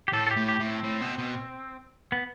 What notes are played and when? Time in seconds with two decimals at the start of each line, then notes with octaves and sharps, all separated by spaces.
0.08 G4
0.13 A2 A4
0.27 A4
0.31 G4
0.37 A2
0.48 G4
0.60 A2
0.66 C4
0.84 A2
1.01 B2
1.18 B2
2.12 B3